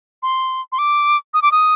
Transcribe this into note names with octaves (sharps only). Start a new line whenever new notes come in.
C6
C6
D6
D#6
D6
D#6